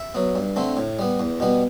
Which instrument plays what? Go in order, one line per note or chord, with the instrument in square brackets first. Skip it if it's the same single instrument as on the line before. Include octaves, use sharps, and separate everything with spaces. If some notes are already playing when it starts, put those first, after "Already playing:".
Already playing: [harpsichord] E5
F#3 B3
G2
D3 A3 C4
A2
G3 B3
E2
B2 G3 B3